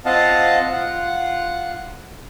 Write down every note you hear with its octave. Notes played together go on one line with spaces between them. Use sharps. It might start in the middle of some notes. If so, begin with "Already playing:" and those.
C4 F4 D#5 F5 F#5 A5
F4 F#5